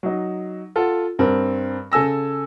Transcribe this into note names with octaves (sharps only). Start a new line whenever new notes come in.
F#3 D#4
F4 A4 F#5
G2 C4 A#4
C#3 A4 G#5 E6 A#6